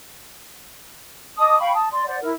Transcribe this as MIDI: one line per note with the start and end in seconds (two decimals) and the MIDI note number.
1.37 1.58 75
1.37 1.58 81
1.37 1.58 86
1.37 1.58 87
1.60 1.73 77
1.60 1.73 79
1.60 1.73 83
1.60 1.73 85
1.74 1.88 81
1.74 1.88 87
1.91 2.05 74
1.91 2.05 84
2.06 2.16 72
2.06 2.16 74
2.06 2.16 78
2.21 2.31 64
2.21 2.31 70